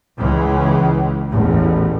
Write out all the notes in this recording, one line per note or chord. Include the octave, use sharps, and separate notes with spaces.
C#2 C#3 E3 G#3
A1 E2 A2